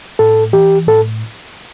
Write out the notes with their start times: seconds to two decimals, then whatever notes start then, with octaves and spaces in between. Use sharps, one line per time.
0.19 A2 A4
0.53 E3 G4
0.88 A2 A4